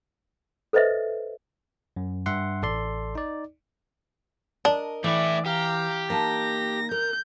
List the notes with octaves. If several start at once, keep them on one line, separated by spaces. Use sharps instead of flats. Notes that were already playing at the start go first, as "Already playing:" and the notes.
A4 B4 C5 D#5 E5
F#2
G2 E5 F#5 C6
A1 A4 D5 C6
D#4 D5
D4 A#4 D#5
E3 A3 E4 D5
G4 F5 A#5
A#3 D#4 A5 A#6
A#4 G6